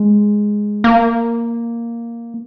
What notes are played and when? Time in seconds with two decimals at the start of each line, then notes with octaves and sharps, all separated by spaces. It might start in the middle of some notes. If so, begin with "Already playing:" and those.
Already playing: G#3
0.84 A#3